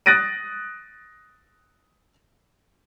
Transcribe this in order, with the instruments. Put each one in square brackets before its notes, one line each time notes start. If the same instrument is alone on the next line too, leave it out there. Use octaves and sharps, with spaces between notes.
[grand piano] D#6 F#6 A6 A#6 D7 D#7